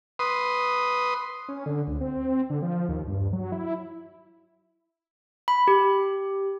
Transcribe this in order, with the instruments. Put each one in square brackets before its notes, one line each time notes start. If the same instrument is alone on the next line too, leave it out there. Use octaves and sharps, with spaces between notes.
[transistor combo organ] B4 C6 D#6
[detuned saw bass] C#4
D3
D2
C4
D3
F3
D#2
G2
F#3
E4
[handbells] B5
G4